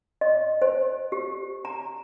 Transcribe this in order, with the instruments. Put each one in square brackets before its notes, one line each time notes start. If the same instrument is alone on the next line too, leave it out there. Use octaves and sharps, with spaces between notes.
[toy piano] D#5
C5
G4
A#5